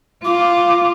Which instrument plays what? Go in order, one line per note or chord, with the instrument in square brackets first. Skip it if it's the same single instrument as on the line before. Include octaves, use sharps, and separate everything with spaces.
[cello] F4 [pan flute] D6